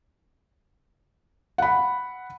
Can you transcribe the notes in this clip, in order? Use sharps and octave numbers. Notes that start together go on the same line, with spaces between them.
F#5 B5